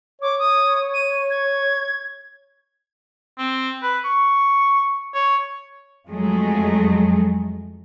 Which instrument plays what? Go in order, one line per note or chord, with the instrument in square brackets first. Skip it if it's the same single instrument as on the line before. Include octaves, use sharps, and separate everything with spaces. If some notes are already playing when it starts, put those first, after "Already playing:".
[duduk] C#5 [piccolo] D6
[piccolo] D#6
D#7
G#6
[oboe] C4
B4
C#6
C#5
[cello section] F2 F#3 G#3 A3